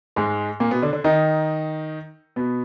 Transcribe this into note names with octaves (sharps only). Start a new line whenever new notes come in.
G#2 G#3
A#2 A#3
B2 B3
D3 D4
D3 D4
D#3 D#4
B2 B3